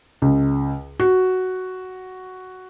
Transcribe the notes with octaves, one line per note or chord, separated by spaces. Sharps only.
C#2
F#4